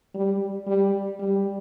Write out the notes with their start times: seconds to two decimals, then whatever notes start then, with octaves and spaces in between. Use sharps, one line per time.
0.14 G3
0.67 G3
1.19 G3